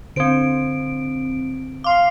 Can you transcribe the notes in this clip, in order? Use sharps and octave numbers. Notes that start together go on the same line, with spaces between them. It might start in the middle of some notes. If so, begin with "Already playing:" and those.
D3 C4 C5 D7
F5 C6 D6